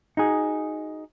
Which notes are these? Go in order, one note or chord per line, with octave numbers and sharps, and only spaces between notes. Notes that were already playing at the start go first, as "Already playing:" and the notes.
D#4 F#4 G#4